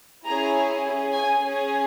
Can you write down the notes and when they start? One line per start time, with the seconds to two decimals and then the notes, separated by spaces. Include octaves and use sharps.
0.25 C#4 E4 G#4 A#5
0.84 C#4 G#4
1.13 G#5
1.43 C#4 G#4